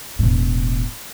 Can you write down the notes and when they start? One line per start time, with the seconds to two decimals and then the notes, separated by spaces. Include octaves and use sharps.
0.19 E1 A2